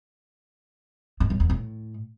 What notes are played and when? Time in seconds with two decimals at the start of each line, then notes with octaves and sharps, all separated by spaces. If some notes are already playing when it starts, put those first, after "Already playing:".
1.20 A2
1.30 F#2
1.40 E2
1.50 A2